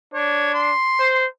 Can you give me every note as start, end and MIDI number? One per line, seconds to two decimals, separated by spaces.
0.14 0.72 62
0.14 0.53 73
0.54 1.14 84
0.99 1.26 72